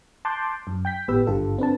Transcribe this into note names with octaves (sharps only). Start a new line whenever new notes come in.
A5 C6 D6 F#6 G6
F#2
G5 G6 B6
G#1 A2 B3 G4 B4 E6
G#1 G2 D3 F4 G4 A4
C4 D4 B4 A5